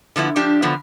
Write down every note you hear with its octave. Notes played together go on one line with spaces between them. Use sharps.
D3 F3 B3 E4
F3 D4 G4
D3 E3 F3 B3